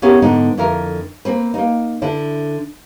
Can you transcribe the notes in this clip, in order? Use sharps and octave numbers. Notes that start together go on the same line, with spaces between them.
B3 C#4 E4 G4 G#4 A#4
G#2 D3 B3 D#4
F2 D3 E4 A#4
A#3 C4 B4
A#3 D#4
D3 D4 E4